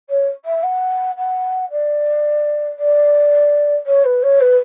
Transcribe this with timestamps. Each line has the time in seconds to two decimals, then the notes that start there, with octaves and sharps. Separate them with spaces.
0.09 C#5
0.45 E5
0.63 F#5
1.17 F#5
1.71 D5
2.78 D5
3.86 C#5
4.04 B4
4.22 C#5
4.40 B4